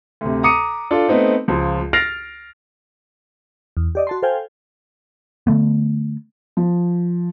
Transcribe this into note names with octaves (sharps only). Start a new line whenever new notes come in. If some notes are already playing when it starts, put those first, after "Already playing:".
D2 C3
A#5 D6 D#6 C#7 D#7
D4 F4 A4
A3 B3 C4 D#4
C#2 F3
F6 A6 A#6 C7 D7 F7
E2
G4 D5 D#5
F#4 A5 C6
A4 C5 F5 G5 G#5
D3 A3 B3
F3